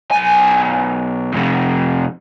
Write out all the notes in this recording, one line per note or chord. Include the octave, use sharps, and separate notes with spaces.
B1 G#5
F2 C3